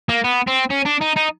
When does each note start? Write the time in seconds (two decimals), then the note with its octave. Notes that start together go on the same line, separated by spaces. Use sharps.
0.09 A#3
0.24 B3
0.48 C4
0.71 C#4
0.86 D4
1.01 D#4
1.17 D#4